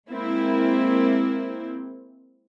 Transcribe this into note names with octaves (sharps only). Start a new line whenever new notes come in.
G#3 A#3 C4 E4